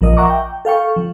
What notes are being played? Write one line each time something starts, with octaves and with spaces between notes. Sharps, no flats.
A#1 F3 A#4 D#5
E5 F#5 A#5 C#6 D6
G5
A4 F5 G5 C#6
F3